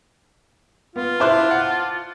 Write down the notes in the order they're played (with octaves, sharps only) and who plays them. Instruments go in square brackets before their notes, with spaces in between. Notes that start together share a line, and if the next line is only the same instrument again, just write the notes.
[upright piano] B3 [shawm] F4
[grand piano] E4 C5 [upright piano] A5 D6 F#6
[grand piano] F#5